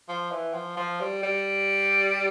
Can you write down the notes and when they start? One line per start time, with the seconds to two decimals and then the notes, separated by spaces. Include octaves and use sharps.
0.08 F3
0.32 E3
0.54 F3
0.76 F3
1.00 G3
1.23 G3